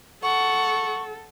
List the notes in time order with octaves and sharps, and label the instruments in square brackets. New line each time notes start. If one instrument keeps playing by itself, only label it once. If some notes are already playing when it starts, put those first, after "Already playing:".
[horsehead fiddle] A4 [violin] F#5 [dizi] C#6